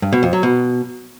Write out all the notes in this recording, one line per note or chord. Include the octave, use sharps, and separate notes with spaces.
G2
B2
F2
F#3
B2